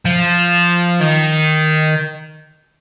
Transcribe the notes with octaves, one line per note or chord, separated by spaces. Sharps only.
F3
D#3